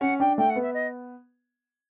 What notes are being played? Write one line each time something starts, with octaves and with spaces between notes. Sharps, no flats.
C#4 F#5
D4 G5
A3 G5
F#5
B3
E5
D#5